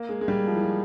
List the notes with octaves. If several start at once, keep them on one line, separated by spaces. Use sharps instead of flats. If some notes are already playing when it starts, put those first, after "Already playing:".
Already playing: A#3
G#3
G#3
G3
F3
E3
F3